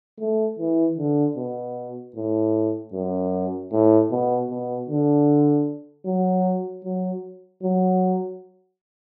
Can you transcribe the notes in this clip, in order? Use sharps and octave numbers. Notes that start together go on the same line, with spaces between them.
A3
E3
D3
B2
A2
F#2
A2
B2
B2
D3
F#3
F#3
F#3